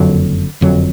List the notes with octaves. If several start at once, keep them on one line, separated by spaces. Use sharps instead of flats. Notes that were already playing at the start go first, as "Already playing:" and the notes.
Already playing: F#1 F2 D3 F#3
F#1 F2 D3 F#3